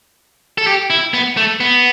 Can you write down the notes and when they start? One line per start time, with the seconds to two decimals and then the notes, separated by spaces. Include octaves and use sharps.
0.58 A4
0.67 G4
0.90 E4
1.13 B3
1.37 A3
1.60 B3